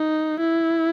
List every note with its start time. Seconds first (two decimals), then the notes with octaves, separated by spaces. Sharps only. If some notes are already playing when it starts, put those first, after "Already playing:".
Already playing: D#4
0.40 E4